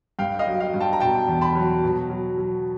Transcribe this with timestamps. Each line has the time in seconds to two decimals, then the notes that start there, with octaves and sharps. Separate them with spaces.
0.19 G2 F5 G5
0.39 D#5 F5
0.47 F#3
0.60 F5 G5
0.74 G2
0.80 G5 A5
0.93 A#5
1.00 B2 G5 A5
1.28 E2
1.41 A5 B5
1.55 F#3
1.83 B2
2.10 F#3
2.38 F#3